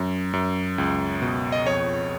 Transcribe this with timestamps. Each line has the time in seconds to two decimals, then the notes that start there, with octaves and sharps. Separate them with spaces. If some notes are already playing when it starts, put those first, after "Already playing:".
Already playing: F#2
0.33 F#2
0.78 C#2
1.22 B2
1.52 D#5
1.65 F2 C#5